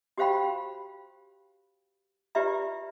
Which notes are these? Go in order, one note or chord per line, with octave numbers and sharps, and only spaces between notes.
F#4 G4 C5 F5 G5 B5
F4 G4 B4 D5 E5 A#5